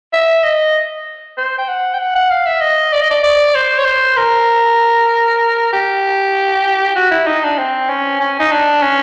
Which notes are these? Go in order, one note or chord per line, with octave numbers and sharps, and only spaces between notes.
E5
D#5
C5
G5
F#5
G5
F#5
F#5
F5
E5
D#5
D5
D#5
D5
D5
C5
C#5
C5
A#4
G4
F#4
E4
D#4
D4
C4
C#4
C#4
D#4
D4
C#4